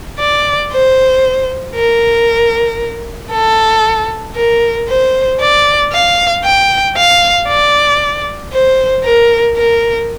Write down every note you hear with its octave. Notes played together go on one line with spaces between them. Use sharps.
D5
C5
A#4
A4
A#4
C5
D5
F5
G5
F5
D5
C5
A#4
A#4